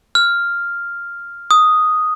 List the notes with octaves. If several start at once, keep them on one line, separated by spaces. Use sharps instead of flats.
F6
D#6